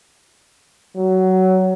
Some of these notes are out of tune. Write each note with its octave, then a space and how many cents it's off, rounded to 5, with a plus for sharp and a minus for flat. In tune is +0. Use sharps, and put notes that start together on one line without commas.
F#3 +15